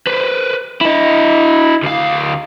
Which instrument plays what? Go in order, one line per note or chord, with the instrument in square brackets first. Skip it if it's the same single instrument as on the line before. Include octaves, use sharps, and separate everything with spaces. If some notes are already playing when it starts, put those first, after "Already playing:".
[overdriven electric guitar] B4 C5
E4 D#5
D2 F5